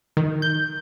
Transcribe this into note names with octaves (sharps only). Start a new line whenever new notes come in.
D#3
G6